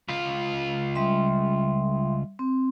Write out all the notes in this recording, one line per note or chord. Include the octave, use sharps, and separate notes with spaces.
C#2 F4
G3 E5 C6
C4